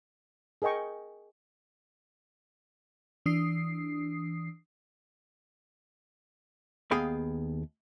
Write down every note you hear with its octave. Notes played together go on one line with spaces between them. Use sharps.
G#4 A#4 D#5 G5 C#6
E3 D4 D#6 C7
D#2 B3 G#4 F5 G5 B5